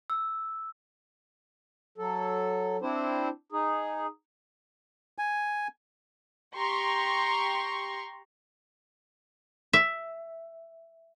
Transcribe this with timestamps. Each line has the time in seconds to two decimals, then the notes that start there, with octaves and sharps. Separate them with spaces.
0.10 E6
1.98 F#3 A4
2.82 C4 D4 E4 C5
3.52 D#4 G#4
5.18 G#5
6.55 G4 A#5 C6 C#6
9.73 E5